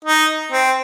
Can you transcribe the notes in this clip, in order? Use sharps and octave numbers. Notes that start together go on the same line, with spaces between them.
D#4
C4